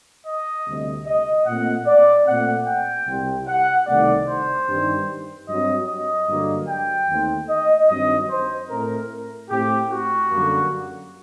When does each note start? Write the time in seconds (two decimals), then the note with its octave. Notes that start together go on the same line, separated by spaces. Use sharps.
0.26 D#5
0.66 D2 C3 G3
1.06 D#5
1.47 A#2 A3 C4 F#5
1.87 D5
2.27 A#2 A3 C4 F#5
2.67 G5
3.07 C2 C3 G3 C4
3.47 F#5
3.87 C2 C3 D#3 A3 C4 D5
4.28 C5
4.68 G2 D#3 G3 C4
5.49 G2 F#3 C4 D#5
5.88 D#5
6.28 G2 D3 F#3 A#3
6.69 G5
7.09 D#2 D#3 A3 C4
7.49 D#5
7.89 G2 D#3 F#3 C4 D#5
8.30 C5
8.70 A2 A3 C4 A#4
9.50 A2 A3 C4 G4
9.90 F#4
10.30 F#2 D3 G3 A#3